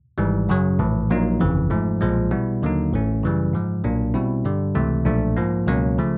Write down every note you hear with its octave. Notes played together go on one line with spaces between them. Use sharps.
G#1 G#2 E3 G3
F#2 C#3 F#3
A#1 A2 E3
A#1 A#2 F#3 A#3 D#4
G1 F2 C#3 E3
G#2 F3 A3
B1 A#2 F3 G#3
B2 G3 B3 E4
D#2 D3 F#3 A#3 D#4
A1 A2 E3 A3 C#4
F#2 C#3 E3 G3
G#2 F3 G#3
B1 A#2 F#3 A#3 D4
B2 G3 C4 E4
G2 D3 G3
C#2 C3 E3 A3
B1 A#2 F3 A3 D4
G#2 F3 A#3
C#2 B2 F#3 A#3 C#4
C#3 F3 A3